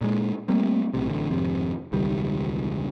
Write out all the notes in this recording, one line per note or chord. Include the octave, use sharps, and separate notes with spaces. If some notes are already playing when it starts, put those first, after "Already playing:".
A#2 G#3
G3 A3 A#3 C4
B1 A2 C3
A1 D3
G#1 F2 C3
E1 C#2 D#3 G3